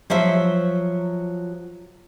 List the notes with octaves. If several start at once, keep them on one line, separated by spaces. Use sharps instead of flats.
F3 F#3 C5 E5